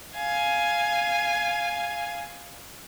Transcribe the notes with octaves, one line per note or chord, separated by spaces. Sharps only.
F5 G#5